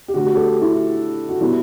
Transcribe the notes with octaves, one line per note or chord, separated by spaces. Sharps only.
G4
D3 A3 F#4
G4
A4
G4
E4
F#4
B2 G3 B3 E4